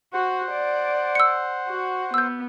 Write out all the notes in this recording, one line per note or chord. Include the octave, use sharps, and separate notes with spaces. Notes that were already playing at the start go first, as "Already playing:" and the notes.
F#4 C5 F#5
D5
E6 C#7
F#4
B3 E6 G6